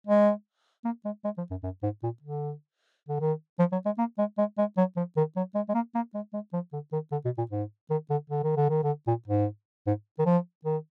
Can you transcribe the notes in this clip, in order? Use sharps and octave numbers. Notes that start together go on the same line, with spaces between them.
G#3
A#3
G#3
G#3
F3
F#2
F#2
G#2
A#2
D3
D3
D#3
F3
F#3
G#3
A#3
G#3
G#3
G#3
F#3
F3
D#3
F#3
G#3
G#3
A#3
A#3
G#3
G#3
F3
D3
D#3
D3
B2
A#2
G#2
D#3
D3
D3
D#3
D3
D#3
D3
A#2
G#2
G#2
D#3
F3
D#3